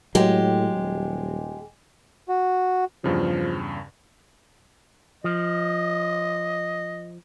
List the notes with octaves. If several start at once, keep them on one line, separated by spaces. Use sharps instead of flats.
A2 F#3 G#3 G4
D#1
F#4
E2 G2 C#3 F3
F3 D#5